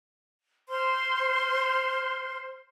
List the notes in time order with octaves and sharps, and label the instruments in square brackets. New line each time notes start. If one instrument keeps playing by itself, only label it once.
[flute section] C5 C6 F6